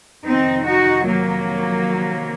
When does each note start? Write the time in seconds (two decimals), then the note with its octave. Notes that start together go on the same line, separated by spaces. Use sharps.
0.24 F2 C3 D#3 C4 D#4
0.65 D#4 F#4
1.06 F#3 A#3